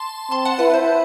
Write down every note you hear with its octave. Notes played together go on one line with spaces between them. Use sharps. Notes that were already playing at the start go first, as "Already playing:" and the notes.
Already playing: A5 C6
C4 A5 C6
F#5 A5
E4 B4
C5